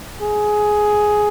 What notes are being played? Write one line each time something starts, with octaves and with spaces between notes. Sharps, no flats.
G#4